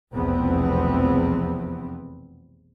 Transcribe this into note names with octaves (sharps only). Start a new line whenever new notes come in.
F1 B1 E2 F3 B3 C4